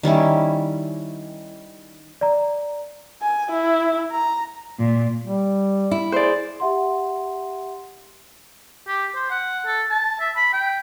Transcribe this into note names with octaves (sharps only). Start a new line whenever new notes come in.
D#3 G3 C#4 E4
D5 A#5
G#5
E4
A#5
A#2
G3
E4
G#4 C5 D5
G4 E5 F#5 C6
G4
C5
F#5
A4
A5
E5
B5
G5